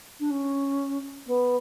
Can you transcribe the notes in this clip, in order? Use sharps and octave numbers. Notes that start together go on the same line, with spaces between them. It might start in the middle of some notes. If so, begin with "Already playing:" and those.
D4
C#4
B3